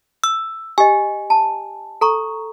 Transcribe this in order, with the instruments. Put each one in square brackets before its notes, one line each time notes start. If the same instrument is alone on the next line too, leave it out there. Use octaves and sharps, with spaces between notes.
[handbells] E6
[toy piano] G4 D#5 [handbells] G#5
[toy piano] A5
A4 A#5 C#6